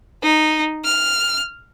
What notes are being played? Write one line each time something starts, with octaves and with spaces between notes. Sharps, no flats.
D#4
F6